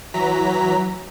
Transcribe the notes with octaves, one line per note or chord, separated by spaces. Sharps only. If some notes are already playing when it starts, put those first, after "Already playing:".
E3 F#3 A#5 B6